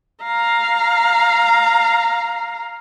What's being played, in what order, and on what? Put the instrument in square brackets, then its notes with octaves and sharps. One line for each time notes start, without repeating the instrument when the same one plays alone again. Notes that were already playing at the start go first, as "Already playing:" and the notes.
[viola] F5 A#5